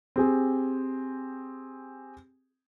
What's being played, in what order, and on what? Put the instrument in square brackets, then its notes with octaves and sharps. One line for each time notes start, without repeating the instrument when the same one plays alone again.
[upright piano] C4 G4 G#4